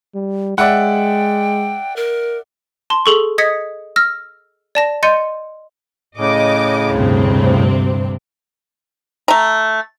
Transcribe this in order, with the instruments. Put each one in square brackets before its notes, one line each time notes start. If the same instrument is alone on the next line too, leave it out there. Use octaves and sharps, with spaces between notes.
[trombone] G3
[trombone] G#3 [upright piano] D5 E5 F#5 [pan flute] G5
[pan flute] A#4
[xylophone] A5 C6
G#4 A4 C#6
D#5 D#6 G#6 A#6 B6 C#7
E6 F6 A#6
D5 A5 A#6
D#5 C6 G6 A6 C#7 D#7
[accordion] A2 C#3 [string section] D#5 D6
[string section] D2 C4 [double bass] G2 C3
[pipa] A3 A#5